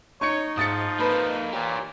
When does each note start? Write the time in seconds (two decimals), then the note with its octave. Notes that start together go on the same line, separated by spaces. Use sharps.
0.21 D#4 C#5 C#6 C#7
0.57 G#2 F3 D#6 A6 C#7
1.00 A#3 A4 B4
1.53 A#2 G4 C#5